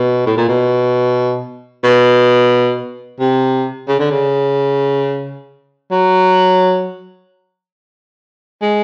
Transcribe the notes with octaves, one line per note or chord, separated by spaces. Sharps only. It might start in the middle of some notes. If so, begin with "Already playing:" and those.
Already playing: B2
A2
A#2
B2
B2
C3
C#3
D3
C#3
F#3
G#3